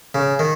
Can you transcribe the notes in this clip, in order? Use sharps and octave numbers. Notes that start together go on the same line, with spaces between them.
C#3
D#3